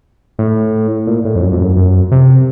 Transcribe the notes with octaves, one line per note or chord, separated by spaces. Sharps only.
A2
A#2
A2
F2
F#2
F2
F#2
F#2
C3